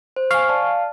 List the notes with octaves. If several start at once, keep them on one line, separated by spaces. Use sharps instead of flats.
C5
F5 G#5 C#6
D5 A5